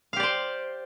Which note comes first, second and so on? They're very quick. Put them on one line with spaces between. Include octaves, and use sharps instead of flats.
F5 G4 D5 C5